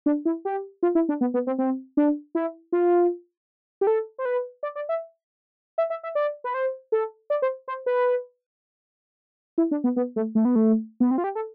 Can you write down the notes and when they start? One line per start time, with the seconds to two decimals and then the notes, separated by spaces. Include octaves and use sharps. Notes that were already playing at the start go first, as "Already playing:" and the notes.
0.06 D4
0.25 E4
0.45 G4
0.83 F4
0.95 E4
1.09 D4
1.21 B3
1.34 B3
1.47 C4
1.58 C4
1.97 D4
2.35 E4
2.72 F4
3.81 G4
3.87 A4
4.19 C5
4.25 B4
4.63 D5
4.75 D5
4.89 E5
5.78 E5
5.90 E5
6.03 E5
6.15 D5
6.44 B4
6.54 C5
6.92 A4
7.30 D5
7.42 C5
7.68 C5
7.86 B4
9.58 E4
9.71 D4
9.84 B3
9.96 B3
10.16 A3
10.35 A3
10.45 B3
10.56 A3
11.00 B3
11.11 C4
11.18 F4
11.24 G4
11.35 A4